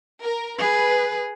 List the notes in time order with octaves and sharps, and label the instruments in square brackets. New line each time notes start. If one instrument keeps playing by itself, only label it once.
[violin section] A#4
[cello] G#4 [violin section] B4